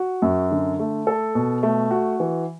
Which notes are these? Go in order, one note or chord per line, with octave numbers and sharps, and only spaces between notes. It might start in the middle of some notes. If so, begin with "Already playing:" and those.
Already playing: F#4
F#2
D3
A3
A4
B2
A3
F#4
E3